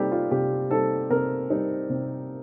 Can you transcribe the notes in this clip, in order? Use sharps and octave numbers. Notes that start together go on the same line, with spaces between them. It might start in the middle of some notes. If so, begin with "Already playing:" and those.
Already playing: C3 G3 C4 D#4 G4 A4
F4
C3 G4
G3 C4 D#4 A4
C3 A#4
G3 C4 D#4
C3